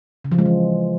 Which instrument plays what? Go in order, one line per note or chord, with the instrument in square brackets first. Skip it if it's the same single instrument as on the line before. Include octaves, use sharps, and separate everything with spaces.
[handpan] C#3
F3
G#3
E3